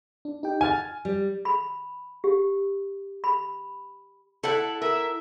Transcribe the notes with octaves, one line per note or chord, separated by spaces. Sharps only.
D4
D#4 G4 G5
F#5 G#5 F6 A6
G3
B5
G4
B5
E4 A4 F#5
A#4 E5